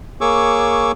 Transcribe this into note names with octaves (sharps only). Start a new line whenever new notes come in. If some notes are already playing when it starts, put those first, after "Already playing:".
A#3 G#4 C#5 C#6 D6 E6